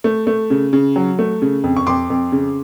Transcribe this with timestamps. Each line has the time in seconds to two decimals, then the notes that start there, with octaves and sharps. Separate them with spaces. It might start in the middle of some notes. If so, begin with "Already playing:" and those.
0.04 A3
0.27 A3
0.50 C#3
0.73 C#3
0.96 F#3
1.19 A3
1.42 C#3
1.64 F2
1.77 C#6
1.87 F2 C6 D6
2.10 F2
2.32 C#3